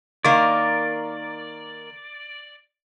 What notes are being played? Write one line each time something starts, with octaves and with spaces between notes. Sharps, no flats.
D#3 A#3 D5